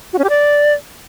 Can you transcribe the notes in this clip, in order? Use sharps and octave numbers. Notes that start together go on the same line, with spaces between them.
F#4
C#4
G4
D5